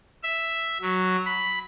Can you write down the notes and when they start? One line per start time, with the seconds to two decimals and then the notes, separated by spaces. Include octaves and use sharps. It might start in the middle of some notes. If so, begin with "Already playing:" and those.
0.23 E5
0.82 F#3
1.26 B5